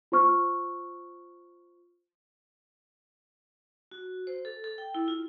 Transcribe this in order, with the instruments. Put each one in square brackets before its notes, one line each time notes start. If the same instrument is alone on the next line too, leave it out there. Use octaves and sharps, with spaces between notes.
[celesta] F4 C5 C#6 F6
[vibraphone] F#4
C5
A4
A4
G5
E4
F4